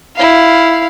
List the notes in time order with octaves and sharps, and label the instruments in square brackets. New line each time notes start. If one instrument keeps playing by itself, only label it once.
[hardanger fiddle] E4 F5